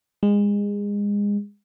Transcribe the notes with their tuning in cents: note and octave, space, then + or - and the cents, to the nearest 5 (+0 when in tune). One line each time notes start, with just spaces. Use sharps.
G#3 -25